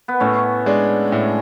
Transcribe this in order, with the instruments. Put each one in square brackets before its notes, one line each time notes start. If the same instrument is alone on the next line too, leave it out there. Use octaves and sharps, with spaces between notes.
[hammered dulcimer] B3
[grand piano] A2 [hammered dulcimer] A3 C#4
[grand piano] G#3 D4
A2